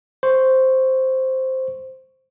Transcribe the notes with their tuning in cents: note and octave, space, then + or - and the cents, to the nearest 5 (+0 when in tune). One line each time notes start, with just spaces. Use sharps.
C5 +0 C#6 +0